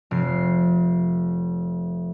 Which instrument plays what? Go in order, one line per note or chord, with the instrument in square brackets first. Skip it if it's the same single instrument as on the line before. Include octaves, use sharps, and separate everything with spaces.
[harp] F1 C7